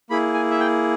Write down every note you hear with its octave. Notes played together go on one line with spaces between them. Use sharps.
A#3 E4 G#4 B5
G#5
E5
G5